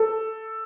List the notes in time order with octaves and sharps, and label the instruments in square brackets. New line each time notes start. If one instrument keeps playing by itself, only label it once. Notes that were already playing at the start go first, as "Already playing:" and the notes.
Already playing: [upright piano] A4